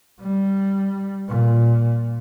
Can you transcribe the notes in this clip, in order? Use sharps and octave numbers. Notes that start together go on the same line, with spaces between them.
G3
A#2